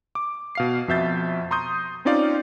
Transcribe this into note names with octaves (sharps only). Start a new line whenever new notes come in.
D6
B2 F5 C7
F2 B2 E5 G6 A6
A#5 C6 C#6 D#6 G6
C4 C#4 D#4 F4 D5 F5